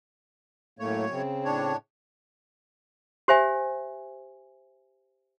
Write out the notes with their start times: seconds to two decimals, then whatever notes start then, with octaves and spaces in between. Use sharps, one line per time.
0.79 F#2 A2 A3 A#3 C#5
1.11 C#3 C4
1.45 A2 D4 C#5
3.28 G4 C5 E5 G#5